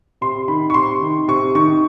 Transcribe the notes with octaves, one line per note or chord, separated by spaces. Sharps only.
C3 C6
D#3 B5
C#6
C3 C6
D#3
C3 C#6
D#3 C#6